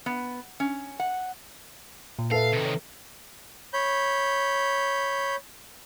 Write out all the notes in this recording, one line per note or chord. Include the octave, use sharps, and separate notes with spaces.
B3
C#4
F#5
A#2
A4 B4 E5 F5
C3 D#3
C#5
C#5 B5 G6